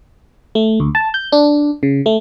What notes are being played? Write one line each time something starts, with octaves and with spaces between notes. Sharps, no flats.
A3
D2
A5
G6
D4
C#3
A3